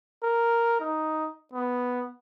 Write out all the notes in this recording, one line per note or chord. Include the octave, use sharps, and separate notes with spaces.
A#4
D#4
B3